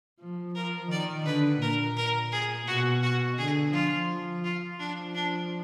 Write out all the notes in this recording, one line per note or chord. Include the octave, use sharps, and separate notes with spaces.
F3
F3 A#4
D#3 D5
D3 B4
A#2 A#4
A#4
G#4
B2 F#4
F#4
D3 G#4
F3 F4
F3
F4
F3 D4
D4